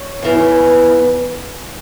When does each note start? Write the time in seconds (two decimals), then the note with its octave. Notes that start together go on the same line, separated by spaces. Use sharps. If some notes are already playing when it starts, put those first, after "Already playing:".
Already playing: C#5
0.22 E2 C#3 E3